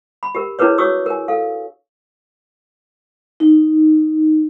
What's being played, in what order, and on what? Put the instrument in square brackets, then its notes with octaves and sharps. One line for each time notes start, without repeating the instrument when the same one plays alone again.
[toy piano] B5
G4 A#4
D4 E4 G#4 A#4 B4 C#5
F#4 C#5 C#6 D#6 E6
A#4 G#5
A4 F5
[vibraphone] D#4